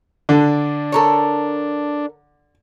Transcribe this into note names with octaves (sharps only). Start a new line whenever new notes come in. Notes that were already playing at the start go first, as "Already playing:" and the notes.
D3 D4
A4 A#4 C#5